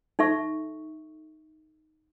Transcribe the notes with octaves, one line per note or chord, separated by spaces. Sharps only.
D#4 A4 E5 C#6